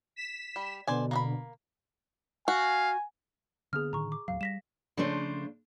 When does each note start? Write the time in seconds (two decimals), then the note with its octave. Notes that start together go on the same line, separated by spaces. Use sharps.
0.16 B6 E7
0.56 G3
0.87 B2 D3 C5 D5 G#5
1.11 A#3 D5 B5
2.48 F#4 F5 G#5
3.73 D3 A#3 B3 G#4 F6
3.93 A2 D3 D#3 A#5 C#6
4.12 D6
4.28 D1 F#2 F#3 F5
4.41 G3 A#6 B6 E7
4.97 C#3 F3 A3 D4 C5